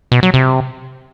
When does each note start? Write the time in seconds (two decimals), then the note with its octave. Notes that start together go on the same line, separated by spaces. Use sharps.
0.12 B2
0.23 F#3
0.34 C3